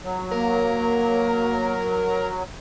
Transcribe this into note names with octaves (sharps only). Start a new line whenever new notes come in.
F#3
A#3 A#4